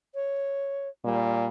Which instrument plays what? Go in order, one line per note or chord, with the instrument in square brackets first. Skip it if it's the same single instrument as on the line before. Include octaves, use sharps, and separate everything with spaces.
[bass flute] C#5
[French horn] A#2 [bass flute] G3